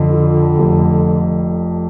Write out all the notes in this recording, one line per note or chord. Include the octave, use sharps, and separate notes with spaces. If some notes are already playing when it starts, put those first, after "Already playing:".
Already playing: F2 D3
F3
F1